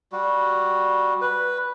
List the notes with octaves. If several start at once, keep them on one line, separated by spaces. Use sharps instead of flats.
G3 F#4
B4